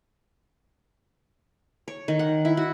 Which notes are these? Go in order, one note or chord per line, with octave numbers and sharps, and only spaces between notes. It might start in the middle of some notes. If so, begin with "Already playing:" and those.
C#5
D#3
F#5
E4
F#4